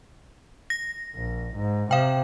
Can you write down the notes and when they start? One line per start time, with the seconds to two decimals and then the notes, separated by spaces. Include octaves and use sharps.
0.70 A#6
1.15 A#1
1.55 G#2
1.91 C3 F5 G5